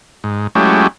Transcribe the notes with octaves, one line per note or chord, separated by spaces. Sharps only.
G#2
F#3 G#3 A3 C#4 E4 G4